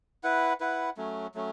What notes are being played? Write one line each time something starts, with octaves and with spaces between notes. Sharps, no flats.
E4 B4 F#5
E4 B4 F#5
F#3 A3 C#4
F#3 A3 C#4